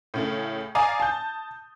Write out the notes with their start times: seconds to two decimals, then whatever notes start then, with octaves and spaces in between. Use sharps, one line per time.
0.14 A2 C#3 A3
0.75 D5 F5 G#5 A#5 D#6
1.00 A5 G6